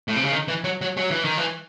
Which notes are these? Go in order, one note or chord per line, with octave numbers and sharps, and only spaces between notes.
A2
C3
C#3
D#3
E3
F#3
F#3
F#3
E3
D#3
E3